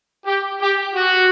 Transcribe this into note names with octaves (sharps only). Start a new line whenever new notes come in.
G4
G4
F#4